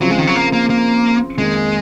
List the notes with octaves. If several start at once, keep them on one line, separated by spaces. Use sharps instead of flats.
C#3 F3 F#3 C4 F4
G#3
D#3
F#3
A#3
A#3
A#3
F2 D#3 G#3 A#3